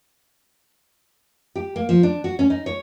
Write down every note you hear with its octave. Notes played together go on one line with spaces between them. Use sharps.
G4
A#3
F3
D4
F#4
C#4
D#4
C#5